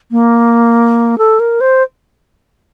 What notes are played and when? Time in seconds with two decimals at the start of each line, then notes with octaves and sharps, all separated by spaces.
0.11 A#3
1.18 A4
1.40 A#4
1.61 C5